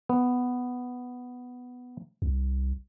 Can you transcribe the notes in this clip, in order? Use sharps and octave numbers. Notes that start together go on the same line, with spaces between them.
B3
C2